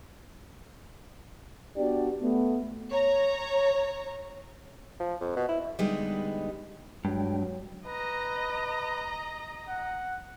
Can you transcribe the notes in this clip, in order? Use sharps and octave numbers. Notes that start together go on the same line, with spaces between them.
B3 D4 F#4 G4 D5
A3 B3
C#5 A#5
F3
F2
B2
E4
D3 G3 G#3 B3 D#4 B4
G2 F#3 G#3 D4 G5
B4 D#5 A#5
F#5